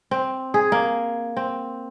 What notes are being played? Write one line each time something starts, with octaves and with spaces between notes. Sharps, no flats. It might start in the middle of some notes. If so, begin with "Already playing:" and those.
C4
G#4
A#3
C4